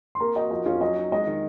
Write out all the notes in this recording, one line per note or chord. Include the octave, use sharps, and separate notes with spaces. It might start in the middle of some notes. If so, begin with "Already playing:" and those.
C6
A#3 A#4 A#5
F#4 D#5
F3 D#5
C#4 F4 F5
F#3 D#5
D#4
G#3 D#5
D#3